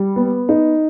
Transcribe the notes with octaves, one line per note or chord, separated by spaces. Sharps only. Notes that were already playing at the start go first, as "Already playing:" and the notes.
Already playing: G3
B3
D#4